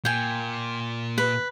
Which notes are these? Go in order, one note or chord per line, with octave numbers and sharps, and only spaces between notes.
A#2 G5 G#5
B4